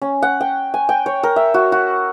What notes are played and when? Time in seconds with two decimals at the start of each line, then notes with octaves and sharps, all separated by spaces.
0.02 C#4
0.22 F#5
0.41 G5
0.74 G#5
0.89 G5
1.06 C#5
1.23 A#4
1.36 E5
1.54 F#4
1.72 F#4